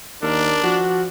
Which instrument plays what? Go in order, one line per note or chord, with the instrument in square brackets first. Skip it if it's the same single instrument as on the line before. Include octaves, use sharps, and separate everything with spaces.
[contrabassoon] D#2 [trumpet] D4 [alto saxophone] A#4
[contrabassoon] F3 [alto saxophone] F#4